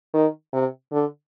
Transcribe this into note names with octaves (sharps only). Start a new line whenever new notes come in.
D#3
C3
D3